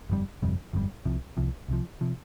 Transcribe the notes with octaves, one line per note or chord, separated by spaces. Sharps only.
G1 F2 C3 G3
G1 F2 C3 G3
G1 F2 C3 G3
C2 C3 F3
C2 C3 F3
C2 C3 F3
C3 F3